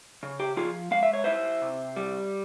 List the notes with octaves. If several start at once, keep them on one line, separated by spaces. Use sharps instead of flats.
C#3
G4
F3 F4 G#4
G#3 F5
E5
C#5
E4 C5 E5
C3
G3